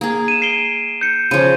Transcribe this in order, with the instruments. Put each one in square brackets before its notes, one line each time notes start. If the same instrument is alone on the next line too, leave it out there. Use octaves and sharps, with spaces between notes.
[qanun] A#3 G#4
[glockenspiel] D#7 E7
C7 D7 G7
G6 C#7
[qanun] C#3 F3 [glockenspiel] D#7